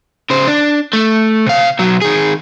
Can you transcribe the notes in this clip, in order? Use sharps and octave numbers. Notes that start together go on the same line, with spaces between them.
C#3 C5
D4
A3
C3 F5
B1 F#3
D#3 G#4